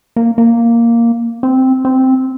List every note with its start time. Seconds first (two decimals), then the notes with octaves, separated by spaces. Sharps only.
0.16 A#3
0.38 A#3
1.43 C4
1.85 C4